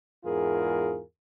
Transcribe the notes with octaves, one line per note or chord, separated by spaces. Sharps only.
E2 G#2 F4 G#4 A#4